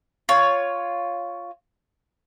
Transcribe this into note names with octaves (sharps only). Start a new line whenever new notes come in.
F4 C#5